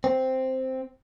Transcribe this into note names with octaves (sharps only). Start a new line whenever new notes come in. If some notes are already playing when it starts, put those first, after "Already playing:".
C4